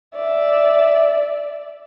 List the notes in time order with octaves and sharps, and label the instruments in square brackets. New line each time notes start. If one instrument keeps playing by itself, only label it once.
[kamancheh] D5 E5